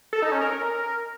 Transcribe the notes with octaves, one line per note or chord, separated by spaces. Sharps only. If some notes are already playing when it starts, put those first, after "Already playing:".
A4
D#4
C#4
A#4